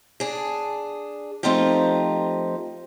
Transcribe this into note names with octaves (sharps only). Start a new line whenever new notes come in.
D4 G#4
F3 A3 C4 D#4 F4 G4